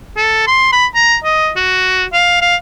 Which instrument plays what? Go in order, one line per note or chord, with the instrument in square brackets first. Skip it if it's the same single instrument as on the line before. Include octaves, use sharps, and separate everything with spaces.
[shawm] A4
C6
B5
A#5
D#5
F#4
F5
F5